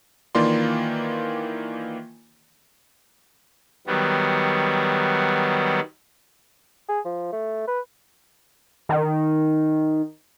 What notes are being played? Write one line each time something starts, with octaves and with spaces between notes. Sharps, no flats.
D#3 E3 A#3 F4 D5 C6
D#3 F#3 G3 B3
G#4
F3
A3
B4
D#3